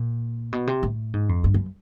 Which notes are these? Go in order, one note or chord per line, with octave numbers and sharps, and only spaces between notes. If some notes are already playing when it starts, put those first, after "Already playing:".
Already playing: A#2
B2
C3
A2
G#2
F2
G2
F#2